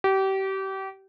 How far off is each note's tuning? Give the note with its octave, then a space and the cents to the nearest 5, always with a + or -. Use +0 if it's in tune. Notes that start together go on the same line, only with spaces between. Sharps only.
G4 -30